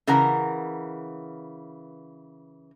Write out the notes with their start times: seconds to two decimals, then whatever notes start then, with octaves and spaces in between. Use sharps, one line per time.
0.07 C#3 E3 A#4 F#5 A#5